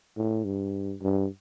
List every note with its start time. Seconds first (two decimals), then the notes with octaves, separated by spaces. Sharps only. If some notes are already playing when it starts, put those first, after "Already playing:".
0.17 A2
0.45 G2
1.02 G2